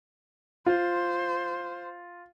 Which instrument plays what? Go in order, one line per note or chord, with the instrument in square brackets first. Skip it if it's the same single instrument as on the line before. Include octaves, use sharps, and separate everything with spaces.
[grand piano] F4 [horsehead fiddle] C5